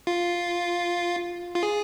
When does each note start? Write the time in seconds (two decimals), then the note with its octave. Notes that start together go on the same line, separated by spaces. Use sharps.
0.07 F4
1.55 F4
1.63 G#4